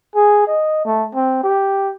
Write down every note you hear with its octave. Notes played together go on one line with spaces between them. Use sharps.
G#4
D#5
A3
C4
G4